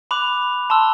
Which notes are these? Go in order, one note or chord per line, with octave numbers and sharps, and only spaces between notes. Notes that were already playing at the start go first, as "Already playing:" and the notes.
B5 D6 F#6 F7
A5 C6 E6